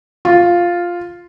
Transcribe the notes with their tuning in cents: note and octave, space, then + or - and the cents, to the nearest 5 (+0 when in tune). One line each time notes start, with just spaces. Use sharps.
F4 +0 F5 +0